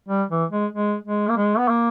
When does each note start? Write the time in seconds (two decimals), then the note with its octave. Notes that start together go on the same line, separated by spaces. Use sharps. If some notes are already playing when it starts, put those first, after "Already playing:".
0.08 G3
0.30 E3
0.51 G#3
0.73 G#3
1.04 G#3
1.29 A#3
1.37 G#3
1.58 B3
1.68 A#3